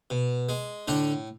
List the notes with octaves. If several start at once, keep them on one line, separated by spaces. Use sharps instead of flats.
B2
G#3
A2 D3 D4